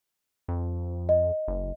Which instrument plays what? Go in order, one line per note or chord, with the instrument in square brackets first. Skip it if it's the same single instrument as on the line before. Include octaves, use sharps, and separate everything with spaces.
[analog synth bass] F2
[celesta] D#5
[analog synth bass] F#1